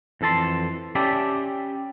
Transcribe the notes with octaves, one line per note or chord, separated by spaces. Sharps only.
F2 E3 A4 A5 C6
C#4 G4 D5 E5 A5 B5